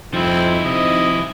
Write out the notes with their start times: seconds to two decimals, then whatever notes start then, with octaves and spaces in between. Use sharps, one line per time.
0.14 F2 F3 C4 D#4 E4
0.65 C3 D#5